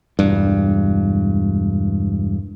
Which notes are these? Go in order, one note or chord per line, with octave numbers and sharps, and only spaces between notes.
E1 G2